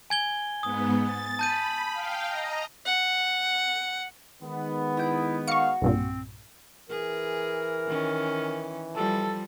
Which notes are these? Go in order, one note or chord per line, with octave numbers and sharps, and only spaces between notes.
G#5 G#6 G7
G#2 B3 D#6
A6
A5 B5 G6 D#7
F5 G5
D#5 A#5
F#5
D#3 G#3 B3
E4 D#5 G5
F#4 F5 C#6 C#7
B1 G2 A#2 C4
E3 G#4 A#4
D#3 C#4
F3 G3 A4